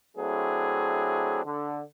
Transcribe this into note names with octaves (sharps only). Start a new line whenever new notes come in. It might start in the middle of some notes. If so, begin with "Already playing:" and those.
F#3 A3 C4 D4 E4 G#4
D3